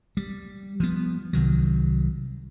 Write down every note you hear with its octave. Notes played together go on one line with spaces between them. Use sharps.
G3
F3 B3
C2 D#3 F#3